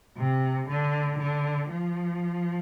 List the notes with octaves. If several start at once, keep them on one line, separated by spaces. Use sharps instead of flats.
C3
D3
D3
F3